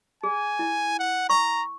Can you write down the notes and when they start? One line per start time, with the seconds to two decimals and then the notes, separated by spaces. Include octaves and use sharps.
0.23 G#4 G#5
0.59 E4
0.99 F#5
1.30 A#5 C#6